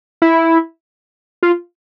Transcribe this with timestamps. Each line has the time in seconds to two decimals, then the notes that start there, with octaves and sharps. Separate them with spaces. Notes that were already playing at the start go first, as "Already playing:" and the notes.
0.22 E4
1.43 F4